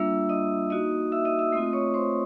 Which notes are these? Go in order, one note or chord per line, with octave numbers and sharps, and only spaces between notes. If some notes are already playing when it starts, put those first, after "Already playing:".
Already playing: G3 A#3 D4 F4 E5 E6
D#5 D#6
A#3 D#4 F#4 D#5 D#6
E5 E6
D#5 D#6
E5 E6
A3 C4 F4 D#5 D#6
C#5 C#6
C5 C6